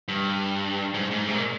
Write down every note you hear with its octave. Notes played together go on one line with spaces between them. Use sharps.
G2
G#2
G#2
C3
A#2